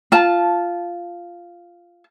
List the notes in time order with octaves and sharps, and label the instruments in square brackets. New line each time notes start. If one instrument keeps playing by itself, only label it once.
[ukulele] F4 A5